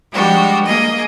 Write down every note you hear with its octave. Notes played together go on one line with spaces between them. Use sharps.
F3 G3 G#3 D4 F#4 G4
A#3 G#4 D#5